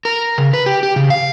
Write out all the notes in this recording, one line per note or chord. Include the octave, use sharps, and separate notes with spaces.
A#4
C#3
B4
G4
G4
C#3
F5